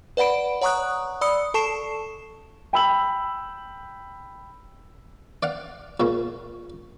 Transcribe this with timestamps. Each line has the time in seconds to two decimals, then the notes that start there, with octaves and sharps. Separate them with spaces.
0.17 B4 D5 F#5 B5 D7
0.61 C#5 F#5 A#5 C#6 D#6 F#6
1.21 D5 B5 D#6 E6 C#7
1.54 A4 A5 C#6 C7 E7
2.73 G5 B5 E6 F#7
5.43 D5 F5 F#5
6.00 A#2 C#3 C#4